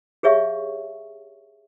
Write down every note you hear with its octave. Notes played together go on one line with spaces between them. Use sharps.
G4 G#4 C#5 E5 F5 C#6